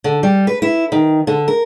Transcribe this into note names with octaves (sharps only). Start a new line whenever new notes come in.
D3
G3
B4
E4
D#3
D3
A#4